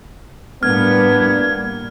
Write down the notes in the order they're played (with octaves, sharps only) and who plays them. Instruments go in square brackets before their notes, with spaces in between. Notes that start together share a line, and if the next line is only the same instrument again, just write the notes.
[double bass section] A2 G3 A#3 [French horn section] B3 D4 [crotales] F6 [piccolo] G#6